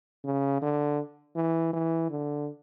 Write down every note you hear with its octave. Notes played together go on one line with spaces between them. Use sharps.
C#3
D3
E3
E3
D3